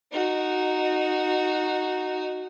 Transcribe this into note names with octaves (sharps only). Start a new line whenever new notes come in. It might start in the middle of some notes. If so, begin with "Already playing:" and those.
D#4 F#4